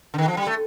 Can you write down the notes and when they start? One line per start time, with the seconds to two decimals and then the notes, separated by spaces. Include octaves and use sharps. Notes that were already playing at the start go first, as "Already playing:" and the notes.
0.14 D3
0.18 D#3
0.28 F3
0.37 G3
0.47 A3